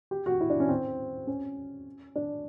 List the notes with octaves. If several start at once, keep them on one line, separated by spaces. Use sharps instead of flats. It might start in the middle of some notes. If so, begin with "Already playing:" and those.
G4
F#4
E4
D4
C#4
C4
C#4
D4